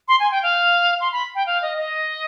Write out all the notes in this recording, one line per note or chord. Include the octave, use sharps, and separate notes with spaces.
C6
G#5
G5
F5
C6
B5
G5
F5
D#5
D#5